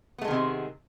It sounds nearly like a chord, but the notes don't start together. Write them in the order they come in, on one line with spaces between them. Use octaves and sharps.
B3 A3 G#3 D#3 C3